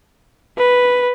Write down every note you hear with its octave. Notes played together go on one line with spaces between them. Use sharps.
B4